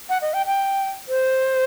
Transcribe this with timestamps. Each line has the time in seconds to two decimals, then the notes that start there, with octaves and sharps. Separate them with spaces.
0.09 F#5
0.22 D#5
0.34 G5
0.46 G5
1.08 C5